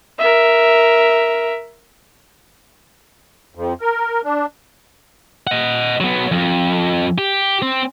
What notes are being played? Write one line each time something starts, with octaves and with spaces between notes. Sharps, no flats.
A#4 E5
F2
A#4
D4
D#5 F#5
F#3 B3
F2
G4
C4